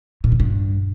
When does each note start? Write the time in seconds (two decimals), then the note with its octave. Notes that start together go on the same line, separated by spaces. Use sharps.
0.24 A#2
0.32 D3
0.40 G2